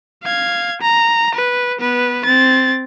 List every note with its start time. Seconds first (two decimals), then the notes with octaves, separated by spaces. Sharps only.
0.24 F5 G#6
0.82 A#5
1.35 B4
1.80 B3 B4
2.26 C4 A6